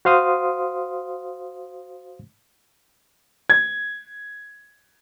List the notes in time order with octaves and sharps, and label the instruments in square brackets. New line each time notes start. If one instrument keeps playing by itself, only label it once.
[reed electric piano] F#4 C5 F5 C6 D#6
[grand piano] G#6